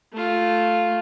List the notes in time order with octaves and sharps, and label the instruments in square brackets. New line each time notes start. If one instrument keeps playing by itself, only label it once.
[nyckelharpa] A3 F4